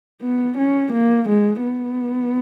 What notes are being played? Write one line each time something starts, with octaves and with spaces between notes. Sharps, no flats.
B3
C#4
A#3
G#3
B3